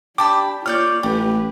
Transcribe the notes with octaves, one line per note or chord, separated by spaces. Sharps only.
D4 G4 A5 B5 D6
A#3 F4 C#5 D5 F6 G6
A1 G4 B4